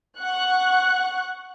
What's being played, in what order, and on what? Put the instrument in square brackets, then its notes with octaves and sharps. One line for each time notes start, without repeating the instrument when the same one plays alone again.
[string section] F#5 C#6 F#6